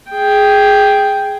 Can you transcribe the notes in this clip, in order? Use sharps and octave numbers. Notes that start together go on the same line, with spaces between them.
G#4 G5